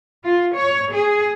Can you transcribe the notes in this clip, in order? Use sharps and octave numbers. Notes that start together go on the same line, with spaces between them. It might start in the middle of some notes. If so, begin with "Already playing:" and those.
F4
C#5
G#4